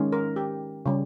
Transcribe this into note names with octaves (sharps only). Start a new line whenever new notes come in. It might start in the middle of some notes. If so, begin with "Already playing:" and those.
Already playing: D#3 G#3 C#4
A#4
G4
C#3 G3